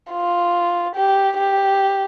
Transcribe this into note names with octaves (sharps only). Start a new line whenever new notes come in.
F4
G4
G4